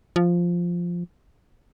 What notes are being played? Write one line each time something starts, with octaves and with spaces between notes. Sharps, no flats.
F3